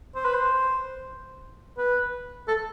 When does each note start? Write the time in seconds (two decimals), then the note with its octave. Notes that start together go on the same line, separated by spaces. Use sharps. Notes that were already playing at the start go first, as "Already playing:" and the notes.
0.16 C5
0.25 B4
0.34 C5
1.78 B4
2.48 A4